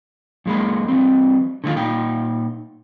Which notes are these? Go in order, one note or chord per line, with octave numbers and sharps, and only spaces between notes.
F#2 G#3 A#3 B5
E3 G3 C4
D3 D#3 A3 B3 F4
A#2 D#4 G5